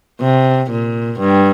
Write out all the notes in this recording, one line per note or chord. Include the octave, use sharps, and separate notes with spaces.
C3
A#2
G2